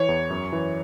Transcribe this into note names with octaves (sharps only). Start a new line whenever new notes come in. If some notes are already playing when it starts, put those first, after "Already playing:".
Already playing: E3 C#5
E2
F#2
E3